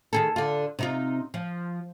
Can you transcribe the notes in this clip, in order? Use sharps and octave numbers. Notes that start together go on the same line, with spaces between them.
D#3 G#4 A4
D3 F4
C3 D#4 F4
F3